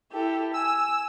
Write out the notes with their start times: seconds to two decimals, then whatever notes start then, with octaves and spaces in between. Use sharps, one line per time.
0.12 E4 G4 A4
0.54 G#5 E6